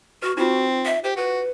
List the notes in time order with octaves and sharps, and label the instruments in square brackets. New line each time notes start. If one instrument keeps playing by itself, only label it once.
[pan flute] F#4 [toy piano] B4 C#6
[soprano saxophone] C4 [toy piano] D#4 F4 [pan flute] F#4
[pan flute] E5
[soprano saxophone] G4 [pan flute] C5
[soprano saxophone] F#4 [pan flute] B4